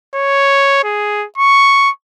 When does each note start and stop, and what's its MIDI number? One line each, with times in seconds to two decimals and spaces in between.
0.15 0.84 73
0.84 1.26 68
1.38 1.90 85